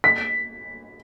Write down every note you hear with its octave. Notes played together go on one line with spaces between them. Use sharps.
B6